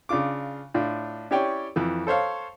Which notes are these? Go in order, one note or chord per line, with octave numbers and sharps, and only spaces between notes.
C#3 D4 F4 D6
A2 D4 F4
C#4 E4 G4 C#5 D5 G5
F2 E3
A4 C5 C#5 F5